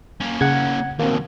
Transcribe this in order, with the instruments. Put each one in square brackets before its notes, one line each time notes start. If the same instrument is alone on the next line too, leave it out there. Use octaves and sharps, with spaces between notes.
[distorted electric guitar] A#3 C#4
[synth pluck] C#3 [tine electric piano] F#5 G#6
[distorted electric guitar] D#2 B2 [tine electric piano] A#3 C4